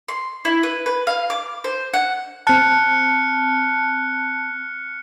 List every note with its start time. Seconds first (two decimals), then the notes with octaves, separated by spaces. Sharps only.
0.08 C6
0.45 E4
0.63 B4
0.86 B4
1.07 F5
1.30 D6
1.64 C5
1.94 F#5
2.47 C4 A5 F6 F#6 C#7